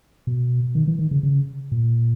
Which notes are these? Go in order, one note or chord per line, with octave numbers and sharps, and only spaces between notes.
B2
D#3
E3
D#3
C#3
C#3
A#2